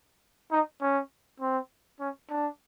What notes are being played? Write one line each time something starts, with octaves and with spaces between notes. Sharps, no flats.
D#4
C#4
C4
C#4
D4